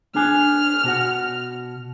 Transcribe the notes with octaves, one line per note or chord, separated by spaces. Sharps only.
D4 G#4 G#5 F6
B2 F#4 F#5